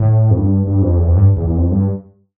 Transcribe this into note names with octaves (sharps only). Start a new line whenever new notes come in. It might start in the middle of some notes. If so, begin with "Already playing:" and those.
Already playing: A2
F2
G2
G2
F2
E2
F2
G2
E2
E2
F2
G2